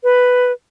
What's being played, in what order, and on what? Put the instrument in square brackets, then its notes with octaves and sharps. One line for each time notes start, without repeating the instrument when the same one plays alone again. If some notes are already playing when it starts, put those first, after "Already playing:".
[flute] B4